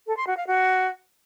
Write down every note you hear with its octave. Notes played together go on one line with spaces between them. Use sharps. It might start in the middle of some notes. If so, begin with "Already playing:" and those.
A4
C6
F#4
F5
F#4